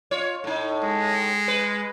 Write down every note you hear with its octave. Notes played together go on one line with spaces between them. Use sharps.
F4 C#5
A2 D#4
G#3
B4